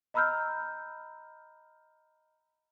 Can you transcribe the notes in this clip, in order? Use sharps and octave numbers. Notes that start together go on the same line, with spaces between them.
D#5 A#5 B5 E6 F6 G6